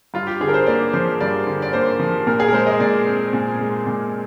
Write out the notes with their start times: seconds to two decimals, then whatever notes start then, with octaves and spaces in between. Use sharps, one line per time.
0.14 G2 F4
0.27 G4
0.41 D3 G#4
0.48 A#4
0.54 C5
0.67 A#3 D5
0.94 F3 C5
1.20 G2 D5
1.47 D3
1.62 D5
1.73 A#3 C5
2.00 F3
2.27 A#2 A#4
2.40 G#4
2.48 A#4
2.53 G#3 C5
2.67 D#5
2.80 A#2 D5
3.06 C4
3.33 A#2
3.59 G#3
3.87 A#2